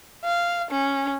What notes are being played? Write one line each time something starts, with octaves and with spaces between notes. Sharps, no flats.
F5
C#4